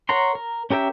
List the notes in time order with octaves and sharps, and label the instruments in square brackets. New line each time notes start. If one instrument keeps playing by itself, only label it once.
[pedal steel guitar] A#4 C#5 F#5 A#5 C6
A#4
C#4 G4 A#4 E5 G5